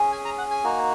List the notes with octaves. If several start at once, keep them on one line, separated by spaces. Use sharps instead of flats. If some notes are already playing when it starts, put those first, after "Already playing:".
Already playing: C#4 G#4
G#5
A#5
F#5
G#5
A#3 D#4 F#4